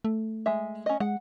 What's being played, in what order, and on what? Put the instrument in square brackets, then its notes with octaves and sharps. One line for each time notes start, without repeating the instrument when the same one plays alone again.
[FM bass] A3
[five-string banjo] G#3 E5
C#4 D#5
[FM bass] G#3 [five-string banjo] F#5